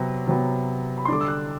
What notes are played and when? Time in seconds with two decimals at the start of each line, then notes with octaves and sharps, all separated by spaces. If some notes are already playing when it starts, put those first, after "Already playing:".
Already playing: C3 F#3 B3
0.27 C3 F#3 B3
0.98 B5
1.05 C6
1.08 D3 G3 D4 D6
1.21 E6
1.28 F#6